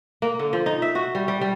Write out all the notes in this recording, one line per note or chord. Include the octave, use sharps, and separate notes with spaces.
A#3
D3
F3
D#4
E5
F#4
G3
G3
G3